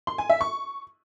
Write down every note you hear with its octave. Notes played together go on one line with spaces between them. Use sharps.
C6
G#5
E5
C#6